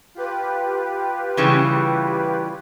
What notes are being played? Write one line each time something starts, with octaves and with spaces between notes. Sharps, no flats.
F4 G4 B4
C#3 E3 G3